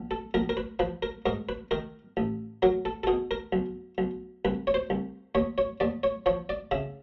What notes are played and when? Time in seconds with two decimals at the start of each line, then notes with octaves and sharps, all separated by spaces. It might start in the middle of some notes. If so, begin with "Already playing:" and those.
Already playing: A#1
0.11 A4
0.34 A#1 A#4
0.49 A#4
0.57 B4
0.79 F3 B4
1.03 A#4
1.26 G#2 A#4
1.49 B4
1.71 D#3 A#4
2.17 A1
2.62 F#3 A#4
2.85 A4
3.03 A4
3.07 B2 G#4
3.31 A#4
3.53 B1
3.98 B1
4.45 C2 B4
4.67 C#5
4.74 C5
4.90 C2
5.35 D#2 C#5
5.58 C#5
5.80 D#2 D5
6.03 C#5
6.26 F3 C#5
6.49 D5
6.71 C#3 E5